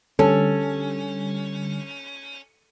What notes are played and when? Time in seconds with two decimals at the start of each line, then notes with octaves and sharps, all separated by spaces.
0.19 D3 G3 C#4 A4